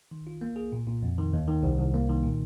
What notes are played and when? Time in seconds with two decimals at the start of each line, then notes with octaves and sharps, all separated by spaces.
0.11 D#3
0.27 F4
0.41 A#3
0.56 G#4
0.72 A#2
0.87 A#2
1.03 F2
1.18 D#3
1.33 D#2
1.47 D#3
1.63 C2
1.79 C2
1.94 A#3
2.09 D#3
2.24 A#2